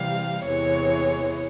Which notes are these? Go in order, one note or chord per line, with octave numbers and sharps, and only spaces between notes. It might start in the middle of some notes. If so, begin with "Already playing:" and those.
Already playing: C3 E3 G3 F5
E2 C3 E3 G#3 C#5